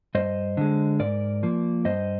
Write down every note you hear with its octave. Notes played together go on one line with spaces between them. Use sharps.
G2 C5 D#5
D3 G#3
G#2 A#4 D5
F3 A#3
G2 C5 D#5